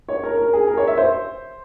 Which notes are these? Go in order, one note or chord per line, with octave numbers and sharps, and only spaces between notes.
C#5
A#4
A#4
G#4
A#4
C#5
E5
C5